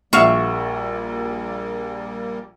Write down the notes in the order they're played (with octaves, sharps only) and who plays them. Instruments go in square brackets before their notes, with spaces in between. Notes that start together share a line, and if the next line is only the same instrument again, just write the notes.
[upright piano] A#1 [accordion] G3 A#3 [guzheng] F#4 F5 [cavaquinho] E5 C#6